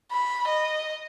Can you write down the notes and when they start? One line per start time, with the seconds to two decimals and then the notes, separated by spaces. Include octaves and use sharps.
0.12 B5
0.48 D#5